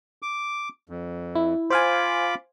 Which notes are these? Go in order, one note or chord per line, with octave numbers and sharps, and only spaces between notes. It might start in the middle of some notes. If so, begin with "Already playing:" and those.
D6
F2
E4
F4 C5 F5 G#5 B5 D6